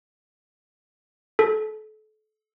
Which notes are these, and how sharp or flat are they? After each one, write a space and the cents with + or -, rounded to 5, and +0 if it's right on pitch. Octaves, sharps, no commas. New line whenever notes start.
A4 -30